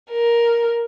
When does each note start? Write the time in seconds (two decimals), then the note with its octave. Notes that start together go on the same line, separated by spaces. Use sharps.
0.10 A#4